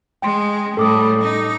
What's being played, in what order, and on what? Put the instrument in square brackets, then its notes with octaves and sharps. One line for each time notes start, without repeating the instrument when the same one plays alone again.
[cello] G#3 [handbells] G5 C6
[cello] A2 G3 [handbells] A4 D6 D#6
[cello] D#4